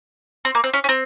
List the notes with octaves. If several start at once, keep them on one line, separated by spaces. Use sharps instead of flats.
C4
A#3
C4
C#4
C#4
C4